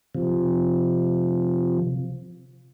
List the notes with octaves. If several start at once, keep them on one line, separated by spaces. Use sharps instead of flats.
C3 F3